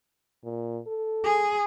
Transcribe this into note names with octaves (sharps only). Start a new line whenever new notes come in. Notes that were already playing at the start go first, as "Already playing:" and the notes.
A#2
A4
G#4